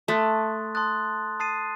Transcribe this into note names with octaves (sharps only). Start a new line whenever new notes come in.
A3 A5 C6 D#6 F#6 A6
A5 C6 D#6 F#6 A6
A5 D#6 A6 C7 D#7